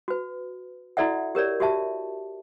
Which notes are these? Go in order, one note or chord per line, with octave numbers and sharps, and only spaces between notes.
F#4 B4
E4 F#4 A4 D5 E5 F#5
G4 A#4 C#5 D5
F#4 G4 E5 A5